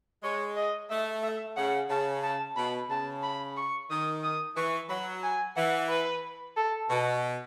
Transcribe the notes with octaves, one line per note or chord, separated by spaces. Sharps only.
G#3 C#5
D#5
A3 E5
E5
C#3 F#5
C#3 A5
A5
B2 B5
C#3 A5
B5
C#6
D#3 D#6
D#6
E3 C#6
F#3 B5
G#5
E3 F#5
B4
A4
B2 F#4